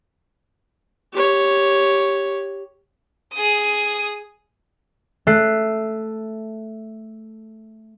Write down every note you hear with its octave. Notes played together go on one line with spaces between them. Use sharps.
G4 C#5
G#4 D#6
A3 F#6 C7